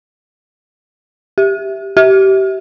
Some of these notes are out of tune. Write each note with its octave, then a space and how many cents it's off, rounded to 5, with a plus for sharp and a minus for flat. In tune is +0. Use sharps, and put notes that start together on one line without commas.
G4 +0
G4 -25